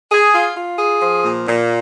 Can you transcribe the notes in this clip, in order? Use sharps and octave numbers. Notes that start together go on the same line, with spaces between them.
G#4
F4
F4
G#4
F3
A#2
A#2